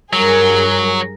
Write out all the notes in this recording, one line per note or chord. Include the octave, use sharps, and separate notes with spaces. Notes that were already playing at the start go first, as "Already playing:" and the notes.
G2 F#3 G#4 A#4